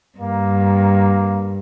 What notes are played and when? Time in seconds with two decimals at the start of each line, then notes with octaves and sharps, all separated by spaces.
0.18 G2 A#3